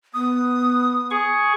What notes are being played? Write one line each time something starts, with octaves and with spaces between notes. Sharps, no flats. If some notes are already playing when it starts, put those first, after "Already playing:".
B3 D#6
G#4 C#6